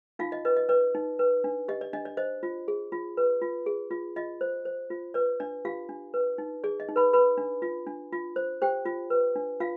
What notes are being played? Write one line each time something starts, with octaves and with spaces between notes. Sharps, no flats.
D#4 F4 F5
D#5
B4 D#5
D#5
B4 D5
D#4
B4
D4
G4 D#5
D5
D4 D#5
D5
C5 D#5
F4
G#4
F4
B4
F4
G#4
F4
F4 D#5
C5
C5
F4
B4 D5
D4 D5
F4 G4 F5
D4
B4
D#4
G#4 D5
D#5
D#4
B4 B5
B4 B5
D4
F4
D4
F4
C5
G4 C5 G5
F4
B4
D4
F4 F5